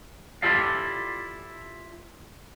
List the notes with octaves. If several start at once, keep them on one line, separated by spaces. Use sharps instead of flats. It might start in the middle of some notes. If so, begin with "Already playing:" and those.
E4 F4 G4 A4 D5 F5